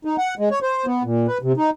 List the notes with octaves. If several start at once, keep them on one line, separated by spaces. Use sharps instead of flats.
D#4
F#5
G#3
C#5
C5
B3
A#2
B4
C3
D#4